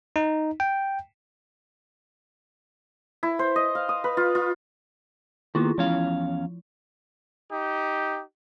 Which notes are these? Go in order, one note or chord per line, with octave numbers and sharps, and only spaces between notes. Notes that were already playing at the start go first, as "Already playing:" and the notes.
D#4
G5
E4
C5
D#5
F5
D#6
B4
F4
F4
D#3 A#3 B3 E4 F4
E2 F3 C#4 F5
D#4 G4